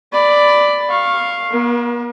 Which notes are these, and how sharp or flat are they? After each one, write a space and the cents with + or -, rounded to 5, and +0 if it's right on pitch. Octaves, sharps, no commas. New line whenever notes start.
D5 +0 B5 +10
F5 +0 C#6 -25
B3 -45 A#4 +35